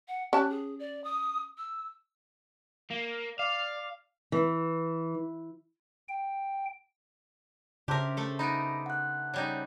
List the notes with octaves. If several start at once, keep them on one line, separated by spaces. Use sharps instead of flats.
F#5
C#4 G4 A5 F#6
G#4
D5
D#6
E6
A#3
D5 F5
E3
G5
C#3 D4 G4 A#4 C5 E5
A3 A4
B3 D#4 B5 A#6 D7
F#5 F#6
C#3 G3 D#4